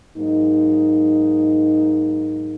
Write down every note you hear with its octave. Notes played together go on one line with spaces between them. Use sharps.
G#2 F#3 A#3 D#4